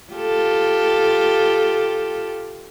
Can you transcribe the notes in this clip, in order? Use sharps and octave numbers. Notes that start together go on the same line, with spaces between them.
F4 G4 A4